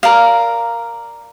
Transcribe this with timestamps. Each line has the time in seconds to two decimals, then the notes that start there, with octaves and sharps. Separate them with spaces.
0.03 A#4 D5 F5